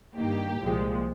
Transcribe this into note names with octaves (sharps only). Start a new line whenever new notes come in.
G2 D#3 A#3 G4
C2 A#2 F3 G#3